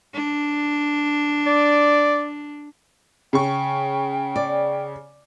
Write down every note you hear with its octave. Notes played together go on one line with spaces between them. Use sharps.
D4
D5
C#3 G5 C#6
D5